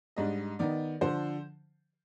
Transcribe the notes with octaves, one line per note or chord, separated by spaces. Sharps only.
G#2 G3 D4 D#5
D#3 B3 D#4 D5
D3 F3 C5